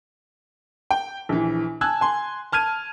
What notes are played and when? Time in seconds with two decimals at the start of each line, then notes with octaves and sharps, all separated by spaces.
0.91 G5
1.29 A#1 E3
1.81 G#5 A5 E6 F#6 G#6
2.01 G#5 C6
2.52 A5 F6 G#6 D#7